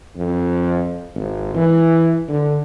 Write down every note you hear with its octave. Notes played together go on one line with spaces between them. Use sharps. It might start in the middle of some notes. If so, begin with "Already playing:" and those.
F2
G#1
E3
D3